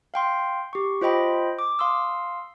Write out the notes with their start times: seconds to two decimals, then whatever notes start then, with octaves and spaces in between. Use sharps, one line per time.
0.14 F5 G5 C6
0.73 G4 C#6
1.01 F4 C5 D#5 G5 B5
1.59 D6
1.79 F5 C6 D#6 E6